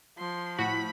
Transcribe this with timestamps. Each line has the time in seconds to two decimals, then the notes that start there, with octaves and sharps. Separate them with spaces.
0.18 F3 C6
0.58 A2 F#4 F#5 B5